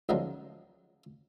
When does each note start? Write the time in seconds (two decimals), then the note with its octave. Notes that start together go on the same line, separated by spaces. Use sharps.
0.09 C#2 D3 D#3 F3 F#3 A#3